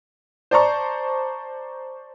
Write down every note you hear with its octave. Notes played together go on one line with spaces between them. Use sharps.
C5 D5 A5 A#5 C#6